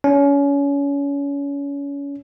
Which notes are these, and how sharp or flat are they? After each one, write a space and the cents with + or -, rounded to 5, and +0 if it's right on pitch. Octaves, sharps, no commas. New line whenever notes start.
C#4 +30